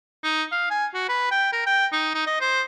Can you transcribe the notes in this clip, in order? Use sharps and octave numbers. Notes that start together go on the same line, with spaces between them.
D#4
F5
G#5
F#4
B4
G5
A#4
G5
D#4
D#4
D#5
C5